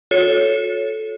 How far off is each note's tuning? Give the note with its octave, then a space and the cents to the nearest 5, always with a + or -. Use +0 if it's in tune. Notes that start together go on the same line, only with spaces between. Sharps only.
F#4 -40 A4 -10 C#5 +0